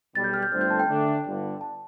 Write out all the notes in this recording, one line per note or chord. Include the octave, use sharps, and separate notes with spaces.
B1 B2 G3 A6
G6
F6
G6
G1 G2 D3 A3 C4 F6
G6
A5
G5
D3 A3 D4
G1 G2 D3
A5